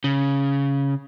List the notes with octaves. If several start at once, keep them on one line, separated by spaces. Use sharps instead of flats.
C#3